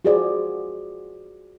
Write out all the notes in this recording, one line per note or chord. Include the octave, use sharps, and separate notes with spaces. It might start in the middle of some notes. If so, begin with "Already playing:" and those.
F4 F#4 G#4 C5 D5